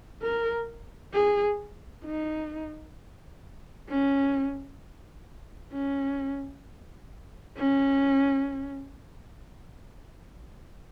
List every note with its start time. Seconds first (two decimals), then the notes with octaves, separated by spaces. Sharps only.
0.22 A#4
1.14 G#4
2.05 D#4
3.89 C#4
5.73 C#4
7.57 C#4